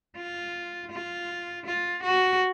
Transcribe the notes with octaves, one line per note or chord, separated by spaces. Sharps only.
F4
F4
F4
F#4